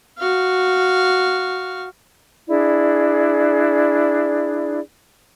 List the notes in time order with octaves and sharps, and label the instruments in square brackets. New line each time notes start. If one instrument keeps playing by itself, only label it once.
[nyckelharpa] F#4 F5
[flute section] D4 E4 G#4 D5